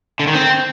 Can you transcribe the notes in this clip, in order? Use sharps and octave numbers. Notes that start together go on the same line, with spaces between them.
D3
D#3
C4